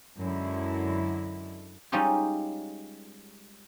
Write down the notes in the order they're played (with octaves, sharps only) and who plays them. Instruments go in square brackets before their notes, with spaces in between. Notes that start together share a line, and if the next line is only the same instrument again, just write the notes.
[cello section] F#2 D3 G#3 E4
[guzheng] G3 G#3 C#4 D#4 F4 G4